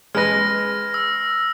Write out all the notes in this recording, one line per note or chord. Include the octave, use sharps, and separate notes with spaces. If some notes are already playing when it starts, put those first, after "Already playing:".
G#3 B4 F6 A#6
E6